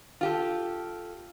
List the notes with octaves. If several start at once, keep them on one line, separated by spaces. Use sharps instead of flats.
F4 G4 A4